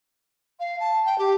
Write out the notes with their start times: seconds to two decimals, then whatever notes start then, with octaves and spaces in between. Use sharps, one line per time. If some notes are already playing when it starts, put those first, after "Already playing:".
0.59 F5
0.79 A5
1.05 G5
1.18 G4